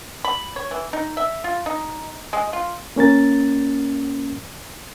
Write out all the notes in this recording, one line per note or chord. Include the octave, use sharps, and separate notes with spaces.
B5
C#5
E3
D#4
E5
F4
D#4
G#3
F4
A#3 C#4 A#4 A6